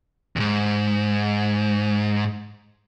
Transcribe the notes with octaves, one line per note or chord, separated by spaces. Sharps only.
E2 G#2